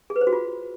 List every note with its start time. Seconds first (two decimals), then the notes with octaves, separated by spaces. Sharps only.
0.10 G#4
0.16 B4
0.21 C5
0.27 F#4
0.33 F4